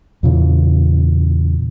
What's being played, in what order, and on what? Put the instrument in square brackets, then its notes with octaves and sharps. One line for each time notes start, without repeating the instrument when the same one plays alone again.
[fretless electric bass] E2 A#2 C#3 E3